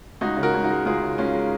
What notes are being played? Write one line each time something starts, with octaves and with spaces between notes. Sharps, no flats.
C#2 D#4 F#4
C#3
F#4 A#4
C#2
D#4 F#4
G#3
C#2 F4 G#4
C#3
C#2 C#4 F4
G#3